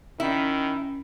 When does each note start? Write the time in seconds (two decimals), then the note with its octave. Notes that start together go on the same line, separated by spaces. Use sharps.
0.20 D#3 C#4 E4